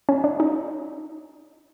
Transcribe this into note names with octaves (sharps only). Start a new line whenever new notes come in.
C#4
D4
D#4